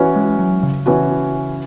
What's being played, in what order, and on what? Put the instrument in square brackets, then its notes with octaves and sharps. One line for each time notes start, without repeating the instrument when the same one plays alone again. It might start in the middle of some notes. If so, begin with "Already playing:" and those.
Already playing: [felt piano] E3 C#4 F#4
[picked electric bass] G#3
F#3
C#3
[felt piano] E3 C#4 F#4